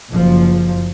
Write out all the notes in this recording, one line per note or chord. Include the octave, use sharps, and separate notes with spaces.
F#1 F3